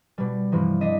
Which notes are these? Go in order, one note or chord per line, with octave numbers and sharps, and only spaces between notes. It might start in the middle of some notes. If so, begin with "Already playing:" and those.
B2 G3
G2 C3 E3 F3
D4 D#5 B6